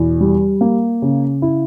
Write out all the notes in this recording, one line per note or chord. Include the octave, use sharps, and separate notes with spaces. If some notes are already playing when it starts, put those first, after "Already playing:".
Already playing: E2 B2
G3
A#3
C#3
E4